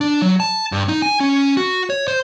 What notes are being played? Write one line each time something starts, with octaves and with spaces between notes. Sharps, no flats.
D4
F#3
A5
G2
D#4
G#5
C#4
F#4
C#5
C5